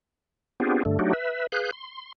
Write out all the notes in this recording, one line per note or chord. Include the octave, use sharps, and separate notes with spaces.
B3 C4 D4 F4 G4 G#4
G2 D3 A3
F#3 A3 D4 D#4 F#4 G4
B4 E5
G#4 B4 F5 F#6 G6
C6